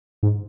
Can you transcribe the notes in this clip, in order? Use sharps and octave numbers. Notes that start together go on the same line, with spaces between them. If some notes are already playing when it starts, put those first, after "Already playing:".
G#2